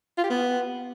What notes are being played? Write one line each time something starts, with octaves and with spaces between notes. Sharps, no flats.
F4
G4
B3